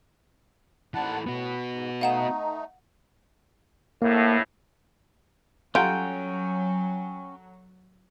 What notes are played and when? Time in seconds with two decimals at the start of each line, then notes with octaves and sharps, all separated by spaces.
0.94 D#2 E3 A4 F#5 A5 B5
1.27 A2 B3 F#4
1.71 G#2
2.01 A3 D#4 D#5 F5 F#5 A#5 E7
4.02 A#1 A2 A#3
5.75 F#3 G3 C#4 F4 A4 F#5 G5 A#5